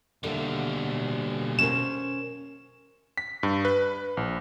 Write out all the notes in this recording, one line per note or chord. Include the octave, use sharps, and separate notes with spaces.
B2 D3 G3 A#3 E5
C#4 A#4 C5 E7
B6
G2
B4
A#1